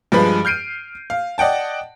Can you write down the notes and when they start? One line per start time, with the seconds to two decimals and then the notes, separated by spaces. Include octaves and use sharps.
0.12 G2 F3 G#3 B4 B5
0.45 F6 G6 C7 D7 D#7
1.10 F5
1.38 D5 D#5 F#5 G5 A5